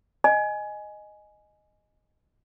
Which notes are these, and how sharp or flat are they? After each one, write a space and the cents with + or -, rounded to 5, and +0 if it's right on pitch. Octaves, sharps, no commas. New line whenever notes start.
D#5 -10 G#5 +10